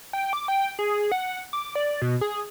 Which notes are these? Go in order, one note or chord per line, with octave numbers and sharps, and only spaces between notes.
G5
D6
G5
G#4
F#5
D6
D5
B2
G#4